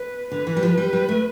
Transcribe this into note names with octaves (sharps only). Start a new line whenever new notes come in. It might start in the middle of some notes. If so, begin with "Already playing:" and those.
Already playing: B4
D3 B4
E3
G3
F3
G3
G3
A3